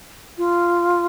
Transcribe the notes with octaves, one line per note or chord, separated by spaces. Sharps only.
F4